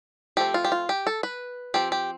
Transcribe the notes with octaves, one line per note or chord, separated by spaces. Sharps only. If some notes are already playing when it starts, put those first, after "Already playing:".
F3 A3 C4 G4
F4
G4
F4
G4
A4
B4
F3 C4 G4
G4